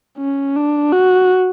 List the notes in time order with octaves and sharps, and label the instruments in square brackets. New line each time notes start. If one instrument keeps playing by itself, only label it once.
[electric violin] C#4
D4
F#4